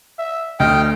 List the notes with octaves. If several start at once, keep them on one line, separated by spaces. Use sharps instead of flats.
E5
D2 D#5 G5 F6